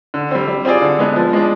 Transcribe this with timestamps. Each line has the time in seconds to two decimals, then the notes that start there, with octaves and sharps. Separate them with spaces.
0.14 D3
0.31 G3 C4
0.48 G3
0.65 C4 F4 G#4 D5
0.82 D3
0.99 G#3 B3 D4
1.16 F3
1.33 G#3 D4